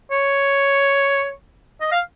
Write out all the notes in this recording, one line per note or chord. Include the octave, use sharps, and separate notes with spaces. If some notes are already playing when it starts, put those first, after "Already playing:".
C#5
D#5
F5